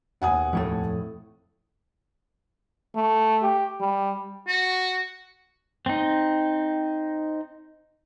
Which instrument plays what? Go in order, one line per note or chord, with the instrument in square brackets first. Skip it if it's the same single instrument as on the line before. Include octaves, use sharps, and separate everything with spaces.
[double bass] D#2 B2 [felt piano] F#5 G#5 D#6
[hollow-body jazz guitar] F2 A2 A3
[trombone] A3
G4
G3
[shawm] F#4
[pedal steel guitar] C4 D#4